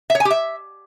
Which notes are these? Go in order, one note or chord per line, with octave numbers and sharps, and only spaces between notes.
E5
C#5
G#5
G4
E5